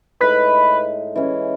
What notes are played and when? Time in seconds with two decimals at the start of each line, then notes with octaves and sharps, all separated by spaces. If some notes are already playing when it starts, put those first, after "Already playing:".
0.21 A2 G#3 D#4 B4
1.16 E3 G#3 C#4